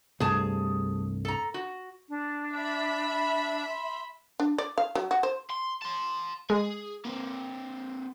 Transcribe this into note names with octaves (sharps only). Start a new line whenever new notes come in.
C2 G2 A3 G#4 A5
A4 A#5
F#4
D4
E5 B5
C6
D4
D5
F5
F#3
F#4
C5
C6
A5 C6
G#3 G#4
A#3 C4